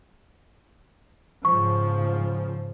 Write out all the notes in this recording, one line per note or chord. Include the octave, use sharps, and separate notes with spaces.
G#2 C#3 F3 C#6